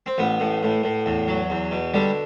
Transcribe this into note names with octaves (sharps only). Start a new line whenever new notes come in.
C4
A1 B3
A2
A2
A2
E2
F#3
E2
B2
D3 G3